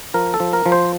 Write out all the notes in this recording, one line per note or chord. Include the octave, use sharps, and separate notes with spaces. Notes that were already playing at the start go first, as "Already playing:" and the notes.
F3 A#4
A4
F3
A#4
F3
C5